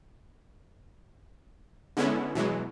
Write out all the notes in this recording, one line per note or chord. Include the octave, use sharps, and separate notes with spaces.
D3 G#3 B3 C#4 E4
B2 E3 F#3 G#3